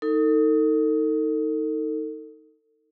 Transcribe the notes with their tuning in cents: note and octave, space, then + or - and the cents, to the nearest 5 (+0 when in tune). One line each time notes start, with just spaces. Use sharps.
D#4 +20 A4 +35